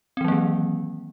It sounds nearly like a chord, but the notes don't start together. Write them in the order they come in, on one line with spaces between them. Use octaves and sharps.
C4 E3 F#3 A#3 D#3